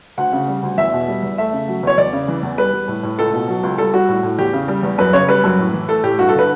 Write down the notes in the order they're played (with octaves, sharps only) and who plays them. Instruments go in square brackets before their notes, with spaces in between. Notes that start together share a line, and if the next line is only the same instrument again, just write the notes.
[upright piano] D2 F#5
C#3
G3
D2
E2 E5
B2
G3
E2
A3 E5
C#3
F#3
E2 C#5
E2 D5
C#3
E3
E2
G3 B4
G3
A2
A2
C#2 A4
B2
F#3
C#2
G3 A4
G3 F#4
A2
A2
E2 G4
C#3
G3
E2
F#2 B4
C#3 C#5
G3 B4
F#2
A2
E3
A3 A4
A2 G4
G2 F#4
A4
D3 B4